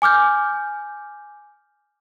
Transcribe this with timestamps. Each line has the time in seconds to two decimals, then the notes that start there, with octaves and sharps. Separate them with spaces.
0.02 G#5 D6 F6 G6